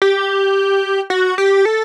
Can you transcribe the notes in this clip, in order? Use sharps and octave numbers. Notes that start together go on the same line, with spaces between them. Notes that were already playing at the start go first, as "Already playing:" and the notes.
G4
F#4
G4
A4